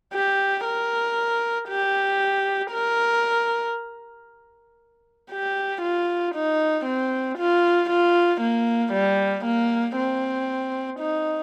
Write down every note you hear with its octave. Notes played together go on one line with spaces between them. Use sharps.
G4
A#4
G4
A#4
G4
F4
D#4
C4
F4
F4
A#3
G3
A#3
C4
D#4